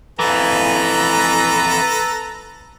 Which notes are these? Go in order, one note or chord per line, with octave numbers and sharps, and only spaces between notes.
F2 E3 A4 B4 A#5